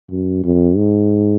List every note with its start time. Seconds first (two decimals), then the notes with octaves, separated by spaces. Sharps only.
0.10 F#2
0.44 F2
0.77 G#2